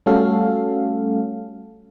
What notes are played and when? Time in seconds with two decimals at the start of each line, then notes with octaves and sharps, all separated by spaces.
0.06 G3 A3 C#4 F#4 A4 F5